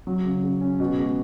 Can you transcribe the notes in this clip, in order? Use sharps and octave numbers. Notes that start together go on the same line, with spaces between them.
F#3
C#3
C#3
C#4
B2
G#3